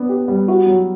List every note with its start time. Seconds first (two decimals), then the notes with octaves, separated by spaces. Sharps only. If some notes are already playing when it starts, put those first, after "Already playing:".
Already playing: B3 D4
0.09 G4
0.28 G3
0.48 E4 F#4
0.67 F#3